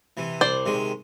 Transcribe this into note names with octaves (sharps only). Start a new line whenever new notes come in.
C3 E3
C2 C5 D5
C3 D#3 G#3